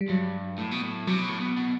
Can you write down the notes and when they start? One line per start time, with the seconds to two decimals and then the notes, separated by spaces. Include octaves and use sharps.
0.01 G3
0.09 G2 F#3
0.58 A2
0.71 B2
0.83 A2
1.07 C3 F#3
1.18 B2
1.29 A2
1.40 B2
1.56 B2